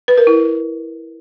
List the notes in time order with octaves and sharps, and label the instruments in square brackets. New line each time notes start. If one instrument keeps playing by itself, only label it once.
[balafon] B4
A#4
E4